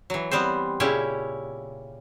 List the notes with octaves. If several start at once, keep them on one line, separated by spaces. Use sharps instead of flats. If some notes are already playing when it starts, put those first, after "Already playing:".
E3 F#3
G3 B3 C4 C5
A#2 C#3 C#4 E4 G4